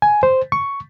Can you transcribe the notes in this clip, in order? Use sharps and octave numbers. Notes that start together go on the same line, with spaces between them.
G#5
C5
C#6